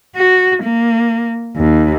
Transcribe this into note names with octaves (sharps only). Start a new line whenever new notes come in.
F#4
A#3
D#2